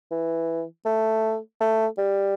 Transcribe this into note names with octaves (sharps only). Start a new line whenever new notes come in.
E3
A3
A3
G3